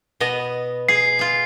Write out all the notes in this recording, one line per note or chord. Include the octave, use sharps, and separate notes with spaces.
B2 B3 D#5
G#4 C7
F4 G#4